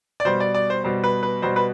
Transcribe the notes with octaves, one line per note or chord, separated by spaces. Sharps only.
D5
B2 G3 C5
D5
D5
C5
B2 G3 C5
B4
B4
B2 G3 C5
B4